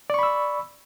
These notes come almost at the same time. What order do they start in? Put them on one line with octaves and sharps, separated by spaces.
D5 C#6 B5 E6